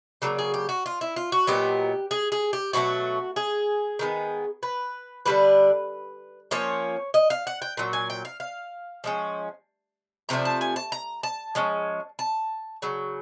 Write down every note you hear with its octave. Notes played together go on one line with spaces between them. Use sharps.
C#3 F#3 A#3 D5
G#4
G4
F#4
F4
E4
F4
F#4
A#2 F#3 B3 D#4 G4
G#4
G#4
G4
B2 F#3 A3 F#4
G#4
D#3 G#3 B3
B4
D3 G3 A#3 D4 B4
F3 A#3 C#4 C#5
D#5
F5
F#5
G5
A#2 F#3
G#5
G5
F5
F5
F3 G#3 C#4
C3 F3 A3 D4 A#5
A5
G#5
A5
A#5
A5
F3 G#3 C#4
A5
C#3 F#3